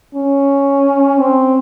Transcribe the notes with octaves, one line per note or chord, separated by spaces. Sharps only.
C#4
C4